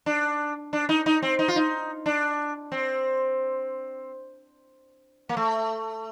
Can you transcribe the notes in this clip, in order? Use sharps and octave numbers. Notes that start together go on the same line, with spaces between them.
D4
D4
D#4
D#4
C4
D#4
F4
D#4
D4
C4
A#3
A3